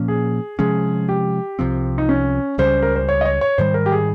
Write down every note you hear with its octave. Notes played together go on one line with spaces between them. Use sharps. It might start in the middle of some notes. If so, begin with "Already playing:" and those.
Already playing: A#2 F3 A#3 C#4
G#4
C3 F3 G#3 C#4 G#4
G4
C2 C3 F3 C4
D#4
C#4
C#2 C#3 G3 C#4 C5
A#4
C5
C#5
D#5
C#5
C#5
G#2 D#3 G3 C5
A#4
G4
G#4